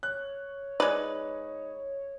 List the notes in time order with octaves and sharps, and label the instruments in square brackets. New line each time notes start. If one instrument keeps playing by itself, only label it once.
[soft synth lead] C#5 [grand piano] F#6
[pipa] G#3 B4 [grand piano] D#4 [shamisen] D5